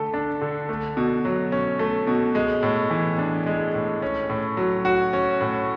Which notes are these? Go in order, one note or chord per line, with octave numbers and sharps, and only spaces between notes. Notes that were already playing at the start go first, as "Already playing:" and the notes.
Already playing: D3 A3 A4
D4
D3
A3
B2
F#3
C#4
A3
B2
G#3
A2
E3
D4
G#3
A2
C#4
A2
F#3
F#4
C#4
A2